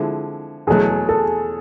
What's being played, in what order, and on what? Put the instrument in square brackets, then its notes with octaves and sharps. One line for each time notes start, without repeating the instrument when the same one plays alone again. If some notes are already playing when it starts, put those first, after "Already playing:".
Already playing: [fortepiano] D3 F3 G#3 C4 E4
[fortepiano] E2 B2 F#3 A3 [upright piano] G#4
[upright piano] A4